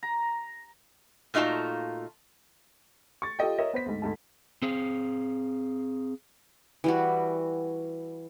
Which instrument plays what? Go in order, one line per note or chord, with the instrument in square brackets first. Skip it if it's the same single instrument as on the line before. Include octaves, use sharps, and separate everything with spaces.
[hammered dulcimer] A#5
[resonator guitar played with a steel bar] A#2 A3 D#4 F4 F#4 A5
[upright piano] C#6 A6
F4 G4 A4 D#5 G5
A#4 C#5 D#5 E5
B3 C5 B6
D2 G#2
D2 G#2 A5
[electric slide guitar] C4 G#4 F5
[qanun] E3 G3 F#4